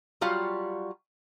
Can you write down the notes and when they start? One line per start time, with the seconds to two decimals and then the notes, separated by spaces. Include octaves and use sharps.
0.21 F#3 G3 F4 F#4 F5